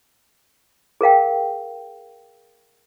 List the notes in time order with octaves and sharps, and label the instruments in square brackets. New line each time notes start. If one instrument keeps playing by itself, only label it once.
[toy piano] G#4 A#4 F5 G5